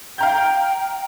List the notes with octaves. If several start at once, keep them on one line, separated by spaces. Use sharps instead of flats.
F5 G5 A#5 G6